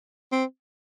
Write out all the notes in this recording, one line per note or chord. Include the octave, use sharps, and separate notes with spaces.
C4